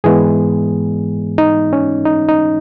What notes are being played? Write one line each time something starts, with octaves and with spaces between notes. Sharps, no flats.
G#2 E3 G#3 B3 G#4
D#4
C#4
D#4
D#4